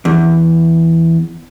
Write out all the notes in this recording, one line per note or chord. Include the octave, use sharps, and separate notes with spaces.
E2